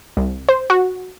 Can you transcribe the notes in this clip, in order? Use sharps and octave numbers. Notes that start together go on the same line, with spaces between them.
C2
C5
F#4